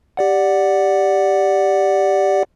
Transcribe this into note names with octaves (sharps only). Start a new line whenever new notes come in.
G4 D5 F#5